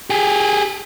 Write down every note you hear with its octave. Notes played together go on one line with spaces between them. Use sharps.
G4 G#4